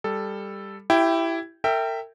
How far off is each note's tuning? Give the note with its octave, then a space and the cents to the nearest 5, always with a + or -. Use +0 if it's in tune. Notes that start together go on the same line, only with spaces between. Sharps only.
G3 +15 A4 +0
E4 +10 G4 -15 G5 +5
A#4 -40 E5 +0 G5 +0